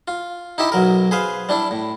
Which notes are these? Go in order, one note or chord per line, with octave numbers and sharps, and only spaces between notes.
F4
D#4 E4 G4 E5
B1 F#3 A#4
G#4 B4 C5 F5
G3 D4 E4
A2